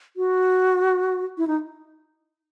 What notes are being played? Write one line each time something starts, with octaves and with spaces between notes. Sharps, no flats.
F#4
E4
D#4